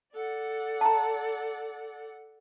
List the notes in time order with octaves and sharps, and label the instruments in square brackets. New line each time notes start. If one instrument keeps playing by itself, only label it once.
[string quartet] A4 D5 F#5
[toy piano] A5 A#5